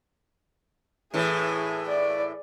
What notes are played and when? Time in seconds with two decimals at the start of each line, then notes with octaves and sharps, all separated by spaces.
1.14 A2 E3 G#4
1.88 D5